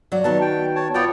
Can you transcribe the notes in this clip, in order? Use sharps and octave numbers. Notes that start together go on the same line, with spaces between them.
F#3 D5
D#3 B3 F#4 A5
G5
C#5 A5
B3 F4 B4 C#5 D5 G5